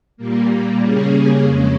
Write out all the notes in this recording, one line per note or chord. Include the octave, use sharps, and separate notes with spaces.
A#2 G3 A#3
C#3 G3 A#3 C#4 G#4
F2 C#3 G#3 C#4